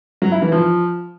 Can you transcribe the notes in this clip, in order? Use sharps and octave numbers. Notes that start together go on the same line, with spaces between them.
F#3
E4
E3
F3